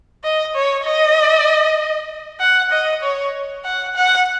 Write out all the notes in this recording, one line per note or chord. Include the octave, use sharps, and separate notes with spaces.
D#5
C#5
D#5
F#5
D#5
C#5
F#5
F#5